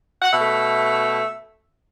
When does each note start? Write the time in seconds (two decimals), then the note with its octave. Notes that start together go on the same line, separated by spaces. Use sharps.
0.22 F#5
0.33 B2 A3 E5